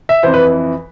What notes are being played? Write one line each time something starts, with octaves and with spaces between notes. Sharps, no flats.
E5
F2 E3 C5
B4